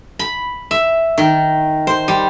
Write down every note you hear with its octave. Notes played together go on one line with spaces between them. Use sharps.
B5
E5
D#3
C5
G3